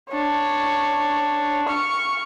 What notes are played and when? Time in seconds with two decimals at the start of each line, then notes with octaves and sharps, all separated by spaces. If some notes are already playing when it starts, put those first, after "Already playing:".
0.10 D4 C#5
1.68 C#6 F6